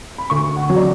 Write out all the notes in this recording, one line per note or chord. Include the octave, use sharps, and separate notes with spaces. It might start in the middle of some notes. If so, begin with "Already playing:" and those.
B5
D2 C#6
F#5
F#3
D5